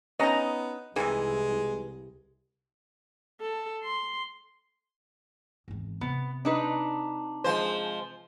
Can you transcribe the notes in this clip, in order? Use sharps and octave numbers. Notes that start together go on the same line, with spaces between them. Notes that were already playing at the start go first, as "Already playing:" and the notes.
B3 C#4 D#4 D#5 A#5
C2 C3 D#3 E3 G#3
A4
C6
G#1 E2
C3 B3
D4 D#4 B4
F3 G#3 C5